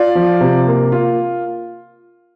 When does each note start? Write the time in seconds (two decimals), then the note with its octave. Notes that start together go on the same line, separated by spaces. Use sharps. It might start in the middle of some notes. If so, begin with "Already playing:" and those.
Already playing: F4 D5
0.15 F3
0.41 C3
0.67 A#3
0.92 F4